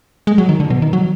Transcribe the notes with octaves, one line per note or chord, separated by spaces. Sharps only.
G#3
F#3
D#3
D3
B2
D#3
F#3